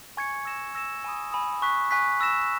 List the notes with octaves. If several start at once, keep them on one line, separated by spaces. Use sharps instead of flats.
G#5 C#6 G#6 C#7
E6 A#6 E7
E6 A#6 E7
G#5 B5 D#6
G#5 B5 D#6
G#5 C#6 F#6 B6
G#5 C#6 F#6 B6
B5 E6 A#6 E7